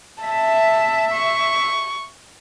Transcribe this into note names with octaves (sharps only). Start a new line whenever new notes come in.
E5 A5
C#6